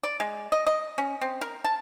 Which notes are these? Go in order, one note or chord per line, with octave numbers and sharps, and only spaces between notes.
D5
G#3
D#5
D#5
C#4
C4
A#4
A5